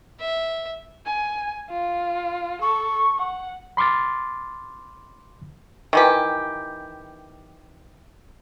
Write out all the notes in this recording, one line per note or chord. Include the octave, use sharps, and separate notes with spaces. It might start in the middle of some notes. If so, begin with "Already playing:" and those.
E5
G#5
F4
A4 C#6
F#5
B5 C6 D6 F6 A6
D#3 E3 G4